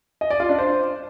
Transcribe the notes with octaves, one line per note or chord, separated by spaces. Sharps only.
D#5
D5
F4
D4
C5